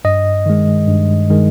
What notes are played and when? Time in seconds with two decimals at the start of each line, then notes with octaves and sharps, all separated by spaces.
0.05 G2 D#5
0.46 D#3 G#3
0.88 G2
1.30 D#3 G#3